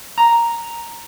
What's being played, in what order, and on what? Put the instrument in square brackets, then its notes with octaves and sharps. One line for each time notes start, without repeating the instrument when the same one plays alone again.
[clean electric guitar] A#5